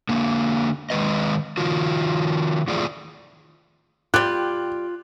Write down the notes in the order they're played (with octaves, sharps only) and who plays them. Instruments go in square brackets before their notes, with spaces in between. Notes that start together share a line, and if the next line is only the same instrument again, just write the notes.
[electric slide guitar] D3 A#3
D#3 G#3 B3 B4 D#5
D#3 F4 F#4
E2 A2 A3 F4 G#4 D5
[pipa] G3 G4 [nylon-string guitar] F4 G5 [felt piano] F#6